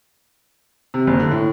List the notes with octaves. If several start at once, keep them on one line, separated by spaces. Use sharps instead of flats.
C3
F#1
D3
A2